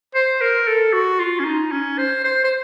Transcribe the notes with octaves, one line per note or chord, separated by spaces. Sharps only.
C5
A#4
A4
F#4
F4
C#4
D#4
C#4
C5
C5
C5